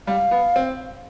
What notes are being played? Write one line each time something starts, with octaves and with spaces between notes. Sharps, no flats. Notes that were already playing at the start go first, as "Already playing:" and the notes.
G3 F5
B3
C4